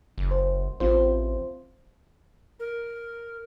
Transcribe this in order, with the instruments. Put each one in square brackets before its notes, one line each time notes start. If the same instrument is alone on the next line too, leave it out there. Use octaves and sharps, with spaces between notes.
[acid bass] F#1
[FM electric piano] C5
[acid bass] A1 [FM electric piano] C4 F4 C5
[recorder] A#4